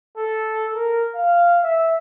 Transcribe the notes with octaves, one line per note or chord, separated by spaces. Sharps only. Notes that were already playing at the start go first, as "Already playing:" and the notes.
A4
A#4
F5
E5